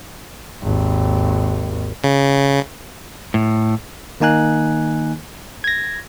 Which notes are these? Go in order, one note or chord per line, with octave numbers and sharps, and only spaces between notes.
G#1 D#2
C#3
A2
D#3 A#3 D#4 G#5 F#6
G#6 A#6